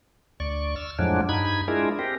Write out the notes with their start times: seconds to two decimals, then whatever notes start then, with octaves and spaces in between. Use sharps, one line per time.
0.40 D2 D5 C#6
0.76 E6 F6
0.99 F2 A2 F3 F#3 G#3 D4
1.29 G2 D#4 B5 G#6
1.68 G#3 D4 E4 F4 G#4 A#4
1.99 C4 G4 A#4